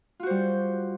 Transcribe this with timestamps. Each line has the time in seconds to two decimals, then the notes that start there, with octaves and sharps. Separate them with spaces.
0.20 F4
0.23 F#4
0.27 C5
0.30 G3